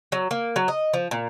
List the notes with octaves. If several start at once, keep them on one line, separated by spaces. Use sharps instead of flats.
F#3
A#3
F#3
D#5
F3
A#2